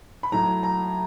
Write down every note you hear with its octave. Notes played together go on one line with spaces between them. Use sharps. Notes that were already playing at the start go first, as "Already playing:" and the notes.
B5
A2 F#3 A#5
A#5